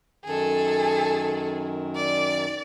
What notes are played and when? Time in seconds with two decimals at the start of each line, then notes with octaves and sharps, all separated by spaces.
0.25 F#2 D#3 G#4 A4
1.96 D5